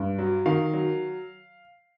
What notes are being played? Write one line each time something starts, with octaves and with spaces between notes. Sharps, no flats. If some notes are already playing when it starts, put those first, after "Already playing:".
Already playing: G2
F#3
D#3 F5
F#3